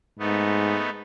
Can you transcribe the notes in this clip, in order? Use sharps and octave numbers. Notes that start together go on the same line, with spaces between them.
G#2 A3 B3 D#4